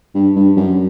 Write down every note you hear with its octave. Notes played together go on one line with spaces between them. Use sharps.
G2
G2
F#2